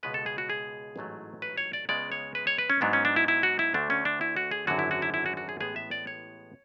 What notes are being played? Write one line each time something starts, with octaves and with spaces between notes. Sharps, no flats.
C#2 B2 G#3 B3 B4
A4
G#4
F#4
G#4
A1 G#2 F#3 A3
B4
C#5
D5
C#2 C#3 G#3 B3 D5
C#5
B4
C#5
B4
C#4
G#2 F#3 B3 D4
C#4
D4
E4
E4
F#4
E4
D2 D3 A3 D4
C#4
D4
E4
F#4
G#4
G#1 F#2 D3 F#3 F#4
E4
F#4
E4
E4
F#4
F#4
G#4
A1 A2 G#3 B3 G#4
E5
D5
C#5